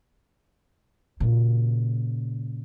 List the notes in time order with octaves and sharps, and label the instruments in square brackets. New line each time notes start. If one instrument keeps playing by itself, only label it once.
[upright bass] A#2 C#3